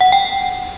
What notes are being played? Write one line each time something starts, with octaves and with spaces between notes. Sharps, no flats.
F#5
G5